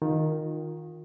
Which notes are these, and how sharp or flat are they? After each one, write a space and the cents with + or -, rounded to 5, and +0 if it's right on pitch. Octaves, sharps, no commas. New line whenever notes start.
D#3 +0 F4 +25